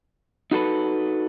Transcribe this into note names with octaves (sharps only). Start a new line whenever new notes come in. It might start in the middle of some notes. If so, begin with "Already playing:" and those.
D#4 F#4 A4 B4